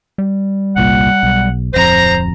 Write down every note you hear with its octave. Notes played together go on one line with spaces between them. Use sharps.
G3
G1 C2 A#2 F#5
B1
D1 F2 C5 A#5 A#6